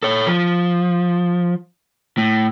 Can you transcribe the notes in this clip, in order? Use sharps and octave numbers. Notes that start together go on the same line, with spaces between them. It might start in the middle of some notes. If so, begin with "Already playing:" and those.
A4 C#5
F3
A2